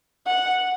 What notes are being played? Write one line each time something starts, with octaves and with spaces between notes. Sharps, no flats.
F#5